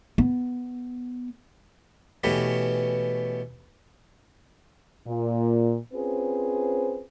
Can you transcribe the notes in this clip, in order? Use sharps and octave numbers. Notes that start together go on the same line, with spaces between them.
B3
B2 E3 A3 B3 C#4 G4
A#2
C4 C#4 F4 G#4 B4 C5